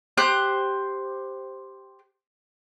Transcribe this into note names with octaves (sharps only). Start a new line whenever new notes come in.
G4 C5 F#6